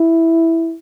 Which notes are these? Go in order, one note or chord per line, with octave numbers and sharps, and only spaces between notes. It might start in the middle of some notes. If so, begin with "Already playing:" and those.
Already playing: E4